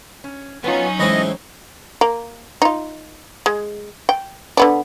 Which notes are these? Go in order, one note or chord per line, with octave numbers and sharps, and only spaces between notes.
C#4
F#3 B3 C#4 D#4 F4
A2 E3 G#3 C4 E4 D#5
A#3
D#4 F4
G#3
G5
D3 B3 D4